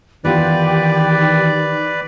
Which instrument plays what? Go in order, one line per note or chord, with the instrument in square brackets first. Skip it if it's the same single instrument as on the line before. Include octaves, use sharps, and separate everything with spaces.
[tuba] D#3 [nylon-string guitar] E3 B3 F4 [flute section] G4 [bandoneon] B4 D5